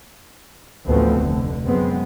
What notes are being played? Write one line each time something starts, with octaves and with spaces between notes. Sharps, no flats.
A1 D2 F3 A3 B3 C4
F1 D3
F#2 G#3 B3 C4